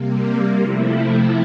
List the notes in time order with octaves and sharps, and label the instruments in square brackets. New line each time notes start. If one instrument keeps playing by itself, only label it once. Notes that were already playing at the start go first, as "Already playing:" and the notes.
Already playing: [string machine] C3 G3 A#3
C3 F3 A3 E4